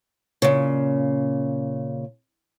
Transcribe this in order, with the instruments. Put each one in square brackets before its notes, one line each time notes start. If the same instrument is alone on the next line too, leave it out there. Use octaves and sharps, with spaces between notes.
[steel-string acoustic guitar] A#2 C#3